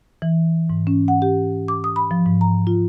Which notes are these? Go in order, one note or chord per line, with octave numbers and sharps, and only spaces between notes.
E3
G#2
C#4
F#5
G4
D6
D#6
B5
F3
G#2
A#5
F4